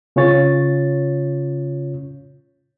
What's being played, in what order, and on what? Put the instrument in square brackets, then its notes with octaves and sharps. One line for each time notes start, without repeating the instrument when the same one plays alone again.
[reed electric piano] C#3 C#4 F4 C#5 A6